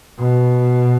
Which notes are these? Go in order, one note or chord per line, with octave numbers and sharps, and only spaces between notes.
B2